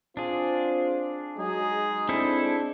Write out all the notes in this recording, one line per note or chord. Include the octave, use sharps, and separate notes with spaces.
C4 D4 F4 G#4
F#3 G#3 D#4 G#4
C4 D4 E4 A4